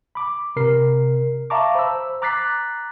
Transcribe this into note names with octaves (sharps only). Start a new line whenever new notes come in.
B5 D6
C3 A#4 C7
E5 F5 A5 A#5 C#6 D6
C5 B5 E6
A#5 D6 F#6 A6 B6 C7